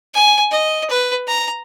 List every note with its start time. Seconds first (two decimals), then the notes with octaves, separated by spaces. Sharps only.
0.14 G#5
0.51 D#5
0.90 B4
1.28 A#5